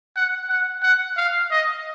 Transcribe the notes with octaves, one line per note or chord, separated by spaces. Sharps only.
F#5
F#5
F#5
F5
D#5